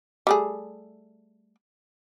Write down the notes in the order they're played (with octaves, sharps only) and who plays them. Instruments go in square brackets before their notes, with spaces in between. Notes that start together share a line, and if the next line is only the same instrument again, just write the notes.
[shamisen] G3 A3 G#4